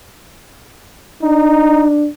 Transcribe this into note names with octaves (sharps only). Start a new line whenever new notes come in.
D4 D#4